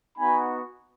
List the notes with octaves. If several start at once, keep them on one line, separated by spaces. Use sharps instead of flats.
B3 D#4 F#4 G#5 B5